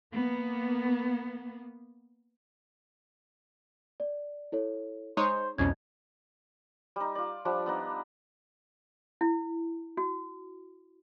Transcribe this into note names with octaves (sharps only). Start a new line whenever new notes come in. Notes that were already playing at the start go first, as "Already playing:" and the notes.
A#3 B3
D5
E4 A4 C#5
G#3 D#4 C5 C#5 C6
C2 F2 B2 C#4 G#6
G3 D#4
F4 D5
F3 G3 D4
B3 D4 D#4
E4
F#4